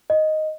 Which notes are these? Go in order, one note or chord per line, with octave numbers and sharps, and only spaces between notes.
D#5